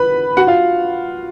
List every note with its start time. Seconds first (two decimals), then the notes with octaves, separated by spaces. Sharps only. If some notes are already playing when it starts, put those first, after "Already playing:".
Already playing: B4 B5
0.37 F#4 F#5
0.47 F4 F5